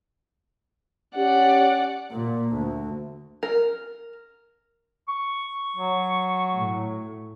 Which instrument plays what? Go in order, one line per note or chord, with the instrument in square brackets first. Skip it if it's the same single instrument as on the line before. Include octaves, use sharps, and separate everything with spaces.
[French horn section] C#4 G4 [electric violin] D5 F#5
[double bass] A#2
D2
[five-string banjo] A#4
[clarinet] C#6
[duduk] F#3
[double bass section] A2